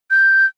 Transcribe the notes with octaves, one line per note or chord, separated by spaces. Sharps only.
G6